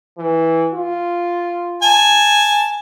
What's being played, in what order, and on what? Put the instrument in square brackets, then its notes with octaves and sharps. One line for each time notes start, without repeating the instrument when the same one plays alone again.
[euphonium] E3
F4
[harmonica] G#5 A5